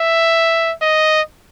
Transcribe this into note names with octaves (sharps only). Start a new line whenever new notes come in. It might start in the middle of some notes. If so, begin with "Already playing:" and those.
Already playing: E5
D#5